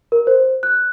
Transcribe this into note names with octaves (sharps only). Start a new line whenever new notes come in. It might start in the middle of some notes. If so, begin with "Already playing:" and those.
A#4
C5
F#6